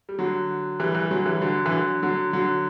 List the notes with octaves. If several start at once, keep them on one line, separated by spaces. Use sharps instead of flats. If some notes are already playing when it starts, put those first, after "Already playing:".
G3
D3 F#3
E3 G3
E3 G3
D3 F#3
E3 G3
D3 F#3
E3
D3 F#3
D3 F#3
D3 F#3